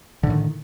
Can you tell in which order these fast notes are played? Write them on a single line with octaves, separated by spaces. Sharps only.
D3 A2 D#3